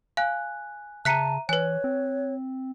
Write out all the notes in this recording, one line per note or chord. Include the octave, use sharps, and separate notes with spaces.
F5 G#5 F#6
C#3 E5 A5 A#5 F#6 B6 C#7 D#7
E3 B4 C#5 G#5 F#6
C4